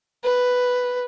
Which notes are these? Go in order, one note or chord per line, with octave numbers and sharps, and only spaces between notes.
B4